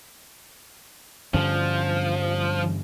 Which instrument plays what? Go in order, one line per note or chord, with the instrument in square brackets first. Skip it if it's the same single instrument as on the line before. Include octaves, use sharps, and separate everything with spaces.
[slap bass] G2 D3 C#4 [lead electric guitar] F3